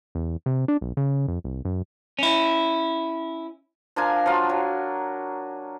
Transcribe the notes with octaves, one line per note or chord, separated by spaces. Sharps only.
E2
C3
D4
B1
C#3
F2
C2
F#2
C#4 E4
F3 D4 A#4 G#5
F3 F#3 F4
F#3